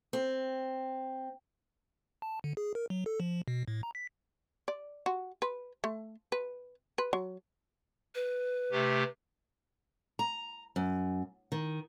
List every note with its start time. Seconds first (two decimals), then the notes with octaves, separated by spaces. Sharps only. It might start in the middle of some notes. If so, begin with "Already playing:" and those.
0.13 C4
2.22 A5
2.44 D3
2.57 G#4
2.75 A#4
2.90 F#3
3.06 A4
3.20 F3
3.48 B2
3.68 A2
3.83 A#5
3.95 B6
4.68 D5
5.06 F#4
5.42 B4
5.84 A3
6.32 B4
6.98 B4
7.13 F#3
8.15 B4
8.72 C3 A3 G4
10.19 A#5
10.76 F#2
11.52 D#3